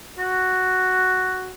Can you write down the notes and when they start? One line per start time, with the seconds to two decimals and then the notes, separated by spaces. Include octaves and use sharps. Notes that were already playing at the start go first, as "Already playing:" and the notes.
0.18 F#4